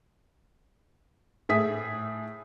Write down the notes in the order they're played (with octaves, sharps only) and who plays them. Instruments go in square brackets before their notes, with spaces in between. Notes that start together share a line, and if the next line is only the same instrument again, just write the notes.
[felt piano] A2 A3 G#4 E5 D#6 B6